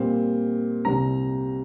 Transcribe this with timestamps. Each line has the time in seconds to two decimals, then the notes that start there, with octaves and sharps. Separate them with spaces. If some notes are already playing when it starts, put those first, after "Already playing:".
Already playing: A#2 G3 C4
0.85 C2 C3 G3 C4 A#5